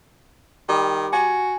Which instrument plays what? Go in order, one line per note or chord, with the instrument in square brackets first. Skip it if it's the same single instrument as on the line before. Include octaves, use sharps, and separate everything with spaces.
[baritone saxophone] D#3 [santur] G3
[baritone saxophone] F#4 [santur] G#5